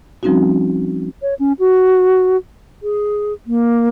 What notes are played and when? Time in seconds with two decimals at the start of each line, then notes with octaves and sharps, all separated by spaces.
0.23 F3 G3 C4 C#4 D#4 F#4
1.22 C#5
1.39 C#4
1.59 F#4
2.83 G#4
3.47 A#3